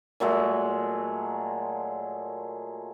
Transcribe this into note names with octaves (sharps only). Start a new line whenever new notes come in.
A#2 F#3 G#3 A3